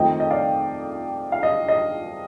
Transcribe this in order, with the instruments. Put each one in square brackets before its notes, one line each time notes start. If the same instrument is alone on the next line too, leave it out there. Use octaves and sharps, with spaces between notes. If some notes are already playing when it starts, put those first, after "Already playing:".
Already playing: [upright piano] F2 D#3 A3 C4 D#5 G5
D#5
D5 F5
F5
D#5
D#5